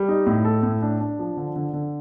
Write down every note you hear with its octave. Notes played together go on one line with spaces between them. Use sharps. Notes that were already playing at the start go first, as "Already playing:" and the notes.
Already playing: G3
D#4
A2
A4
A2
D4
D4
F3
D3
D3
D3